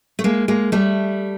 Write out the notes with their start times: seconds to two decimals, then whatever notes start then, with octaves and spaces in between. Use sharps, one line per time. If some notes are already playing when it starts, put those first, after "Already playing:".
0.19 A3
0.24 G#3 A#3
0.48 G#3 A#3
0.72 G3 A3